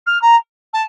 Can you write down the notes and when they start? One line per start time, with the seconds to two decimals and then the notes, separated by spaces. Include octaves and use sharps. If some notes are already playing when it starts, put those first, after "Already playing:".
0.06 F6
0.21 A#5
0.73 A5